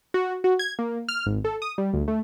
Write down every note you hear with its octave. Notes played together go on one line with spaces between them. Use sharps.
F#4
F#4
G#6
A#3
F6
G#1
A4
D#6
G3
D2
A3